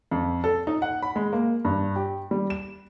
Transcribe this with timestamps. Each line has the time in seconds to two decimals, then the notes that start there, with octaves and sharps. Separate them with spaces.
0.11 F2
0.44 A4
0.67 D#4
0.82 F#5
1.02 B5
1.16 G#3
1.33 A#3
1.65 G2
1.96 G4
2.31 G3
2.50 E7